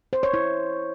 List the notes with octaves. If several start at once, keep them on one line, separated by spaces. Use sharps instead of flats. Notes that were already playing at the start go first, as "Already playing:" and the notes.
C5
C#5
E4